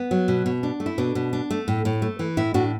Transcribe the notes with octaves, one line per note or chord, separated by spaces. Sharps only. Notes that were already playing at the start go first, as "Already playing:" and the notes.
Already playing: B3
F#3
B2
B2
D4
A3
E4
B2 D4
B2
D4
A3
A2
A2
A3
E3
A2 E4
A2 D4 F#4